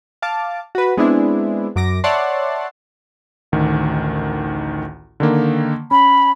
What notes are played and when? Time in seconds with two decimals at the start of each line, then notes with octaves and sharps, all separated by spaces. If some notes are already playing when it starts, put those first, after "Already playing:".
0.22 F5 A5 D6
0.75 F#4 B4
0.97 G#3 B3 C4 D4 E4
1.76 F#2 D6 A#6
2.04 C#5 D5 E5 F#5 A5 C6
3.52 A1 D2 D#3
5.20 D3 D#3 A#3
5.91 C#4 B5